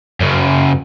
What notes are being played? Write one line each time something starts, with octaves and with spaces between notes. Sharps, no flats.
F#2 C#3